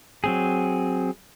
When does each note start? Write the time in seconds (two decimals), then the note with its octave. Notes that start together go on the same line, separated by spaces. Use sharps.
0.24 F#3 C4 G#4